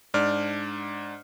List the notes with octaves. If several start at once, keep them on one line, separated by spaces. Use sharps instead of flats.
G#2 D4 D5 F6